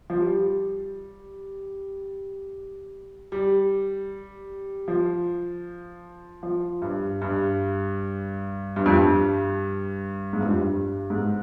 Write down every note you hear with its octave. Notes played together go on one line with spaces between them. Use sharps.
F3
G3
G3
F3
F3
G2
G2
G2
F2
G2
G#2
G2
F2
G2
G#2